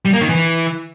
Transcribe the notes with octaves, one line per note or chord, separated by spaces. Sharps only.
G3
A#3
D#3
E3